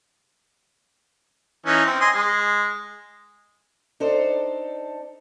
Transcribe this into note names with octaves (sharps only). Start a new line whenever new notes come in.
E3 C#4 D#4
C4
D#5 G#5 C6
G#3
D4 D#4 A4 C5